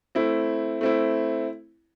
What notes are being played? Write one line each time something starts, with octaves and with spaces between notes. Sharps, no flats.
A3 C4 E4
A3 C4 E4